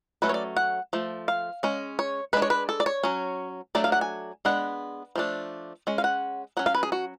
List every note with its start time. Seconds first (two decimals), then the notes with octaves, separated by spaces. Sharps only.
0.22 F#3 A3 C#4 B4
0.29 C#5
0.34 D5
0.56 F#5
0.93 F3 A3
1.28 F5
1.63 G#3 C#4
1.99 C#5
2.33 G#3 D4 B4
2.42 C#5
2.50 B4
2.69 A4
2.80 D5
2.86 C#5
3.03 F#3 C#4
3.75 F#3 A3 D4 D5
3.84 F5
3.92 F#5
4.01 G#5
4.45 G#3 B3 D4 F#5
5.16 F3 A3 D4
5.87 G#3 C#4
5.98 F5
6.04 F#5
6.57 F#3 C#4 F#5
6.66 F5
6.75 B4
6.83 G#4
6.92 F#4